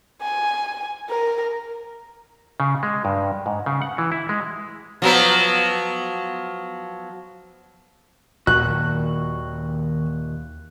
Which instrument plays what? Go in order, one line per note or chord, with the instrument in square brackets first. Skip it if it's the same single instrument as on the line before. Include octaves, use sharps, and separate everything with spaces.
[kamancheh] G#5
A#4
[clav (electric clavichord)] C#3
G#3
G2
G#2
C#3
F#5
E3
E4
G#3
[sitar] F3 F#3 B3
[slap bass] D#2 A#2 F#3 [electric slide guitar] D#3 F#4 [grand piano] F#6